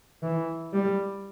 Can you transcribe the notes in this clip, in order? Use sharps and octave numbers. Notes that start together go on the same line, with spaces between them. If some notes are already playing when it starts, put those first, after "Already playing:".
E3
G3